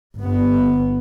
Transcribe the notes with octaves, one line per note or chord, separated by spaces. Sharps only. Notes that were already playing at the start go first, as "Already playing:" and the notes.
G1 B3